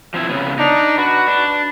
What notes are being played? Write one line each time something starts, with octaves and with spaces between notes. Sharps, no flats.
F3 C4 E4
C#3 B3
D4 D#4
F#4 B4
D4